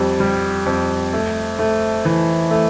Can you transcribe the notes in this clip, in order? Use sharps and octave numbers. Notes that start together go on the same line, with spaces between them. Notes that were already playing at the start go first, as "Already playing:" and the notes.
Already playing: F2 G3
G3
F2
A3
A3
E3
A3